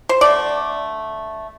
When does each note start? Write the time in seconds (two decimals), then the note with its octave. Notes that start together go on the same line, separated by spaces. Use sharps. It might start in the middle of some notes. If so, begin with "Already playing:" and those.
0.09 C5
0.21 D3 A3 D5